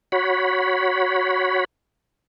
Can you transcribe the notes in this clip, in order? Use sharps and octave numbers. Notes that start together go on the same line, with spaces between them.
F#4 C#5 B5